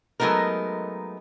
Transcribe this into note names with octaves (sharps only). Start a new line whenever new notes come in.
F#3 G#3 A3 B3 D#4 A#4